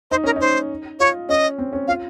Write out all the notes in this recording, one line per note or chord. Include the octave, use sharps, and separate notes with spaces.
D#4 C5
C#4 A#4
D#4 C5
F4 C#5
C#4 D#5
C4
C#4
F4 F5